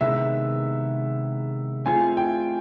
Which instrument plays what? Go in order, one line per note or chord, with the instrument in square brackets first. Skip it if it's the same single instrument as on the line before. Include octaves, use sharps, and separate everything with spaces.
[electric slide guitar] C3 D#3 G#3 B3 E4 [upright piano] E5
[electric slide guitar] A3 C4 F4 G#4 [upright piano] G#5
[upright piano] G5